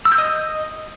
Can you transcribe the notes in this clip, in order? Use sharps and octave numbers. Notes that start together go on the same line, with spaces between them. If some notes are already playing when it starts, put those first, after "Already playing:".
E6
G6
D#5